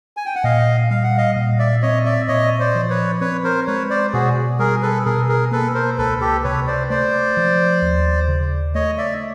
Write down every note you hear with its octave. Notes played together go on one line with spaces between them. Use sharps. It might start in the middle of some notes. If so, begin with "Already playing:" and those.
G#5
G5
F#5
A#2 D#5 F5
G3 F5
F#5
D#5 F5
A#2
D5 E5
C4 C#5 D#5
D5 E5
A#2 C#5 D#5
C5 D5
F3
B4 C#5
C4 B4 C#5
A#4 C5
G#3 B4 C#5
C5 D5
B2 F#4 G#4
G3 G#4 A#4
A4 B4
B2 G#4 A#4
G#4 A#4
A#3 A4 B4
A#4 C5
C#2 A4 B4
G4 A4
C3 B4 C#5
C5 D5
A3 C5 D5
F3
D#2
C#3
A3 C#5 D#5
D5 E5